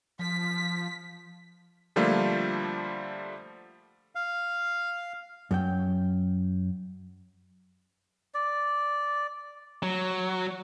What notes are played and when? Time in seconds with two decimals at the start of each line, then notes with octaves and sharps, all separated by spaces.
0.19 F3 B6
1.96 D3 F3 G3 A3 A#3 F4
4.15 F5
5.51 F#2 F#3 G5
8.34 D5
9.83 F#3